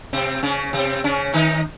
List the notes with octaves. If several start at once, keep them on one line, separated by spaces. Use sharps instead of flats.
C3 C4
C#3 C#4
C3 C4
C#3 C#4
D#3 D#4